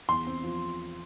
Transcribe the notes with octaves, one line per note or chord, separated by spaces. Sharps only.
E2 C6
C4
F3